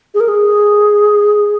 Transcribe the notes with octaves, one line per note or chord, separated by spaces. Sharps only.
G#4
A#4
G#4